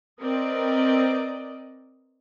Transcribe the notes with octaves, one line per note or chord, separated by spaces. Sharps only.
C4 A#4 B4 D5 D#5